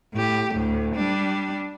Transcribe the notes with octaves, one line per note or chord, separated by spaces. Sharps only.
A2 G4
D2 A2
G3 D4